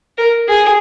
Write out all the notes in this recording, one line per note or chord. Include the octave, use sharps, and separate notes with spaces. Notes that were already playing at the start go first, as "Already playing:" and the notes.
A#4
G#4